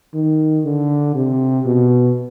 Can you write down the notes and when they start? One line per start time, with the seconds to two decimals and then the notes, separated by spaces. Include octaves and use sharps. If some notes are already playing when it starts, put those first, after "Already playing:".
0.14 D#3
0.65 D3
1.15 C3
1.65 B2